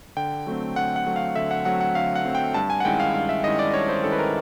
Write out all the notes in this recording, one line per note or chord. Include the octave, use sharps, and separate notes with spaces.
D3 G5
F#3 A3 C4
D3 F#5
F#5
F#3 A3 C4
F5
D3 E5
F#5
F#3 A3 C4 F#5
F#5
D3 F5
F#5
F#3 A3 C4
G5
G2 A5
G#5
F#5
D#3 G#3 C#4 E4 G5
F5
G2 F5
E5
D#3 G#3 C#4 E4 D#5
D5
G2 C#5
C5
D#3 G#3 C#4 E4 A4
B4
A#4